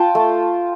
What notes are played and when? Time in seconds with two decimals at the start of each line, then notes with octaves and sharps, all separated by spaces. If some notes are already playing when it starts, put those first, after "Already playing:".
Already playing: F4 G5 A5
0.15 A3